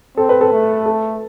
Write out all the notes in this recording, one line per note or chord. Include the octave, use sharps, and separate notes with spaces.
C4 A4
B4
A4
A3
A4